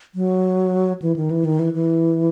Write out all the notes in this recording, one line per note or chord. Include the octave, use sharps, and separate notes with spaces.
F#3
E3
D#3
E3
D#3
E3
E3